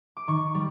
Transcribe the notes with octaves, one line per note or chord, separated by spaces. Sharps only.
D6
D#3 C#6
G3